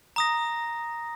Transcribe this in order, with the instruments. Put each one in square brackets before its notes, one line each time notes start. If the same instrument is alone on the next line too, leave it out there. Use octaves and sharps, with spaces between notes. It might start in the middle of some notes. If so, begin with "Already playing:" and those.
[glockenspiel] A#5 D#6 A#6